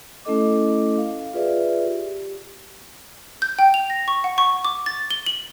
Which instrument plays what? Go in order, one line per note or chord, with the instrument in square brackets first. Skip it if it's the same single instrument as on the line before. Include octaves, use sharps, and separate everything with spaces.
[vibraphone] A3 C#4 E4 A4 D#5 D6
F5
F4 G#4 B4 D5 E5
G4
[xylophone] G6
G5
F7
A#6
C#6
F#5
C#6
D6
A6
G7
F#7